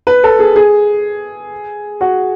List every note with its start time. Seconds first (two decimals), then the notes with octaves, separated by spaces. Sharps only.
0.07 B4
0.24 A4
0.39 G#4
0.56 G#4
2.01 F#4